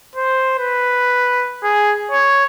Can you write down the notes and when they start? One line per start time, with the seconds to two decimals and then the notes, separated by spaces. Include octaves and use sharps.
0.16 C5
0.59 B4
1.63 G#4
2.12 C#5